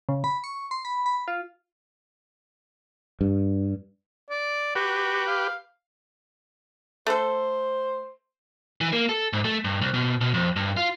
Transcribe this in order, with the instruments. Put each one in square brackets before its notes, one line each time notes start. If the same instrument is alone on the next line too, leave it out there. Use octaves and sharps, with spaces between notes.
[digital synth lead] C#3
B5
C#6
C6
B5
B5
F4
[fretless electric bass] G2
[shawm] D5
[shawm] F#4 [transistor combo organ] G4 B4
[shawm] F5
[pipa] A3 A4 [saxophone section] C5
[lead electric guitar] E3
A#3
A4
G#2
A3
G2
C2
B2
B2
F2
G2
F4